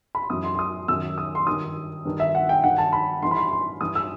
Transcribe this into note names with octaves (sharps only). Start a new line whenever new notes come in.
B5
C6
F#2 E3 D#6
C6
C6
D#6
F#2 D#3 E6
D#6
C6
G2 D#3 D#6
G2 D#3
E5
F#5
G5
G2 D#3 F#5
A5
B5
G2 E3 C6
B5
C6
C6
G2 E3 D#6
E6